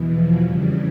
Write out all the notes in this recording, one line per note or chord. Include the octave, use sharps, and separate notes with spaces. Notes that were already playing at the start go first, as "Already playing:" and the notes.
Already playing: E2 B2 E3
F3
F2 C#3 E3 G3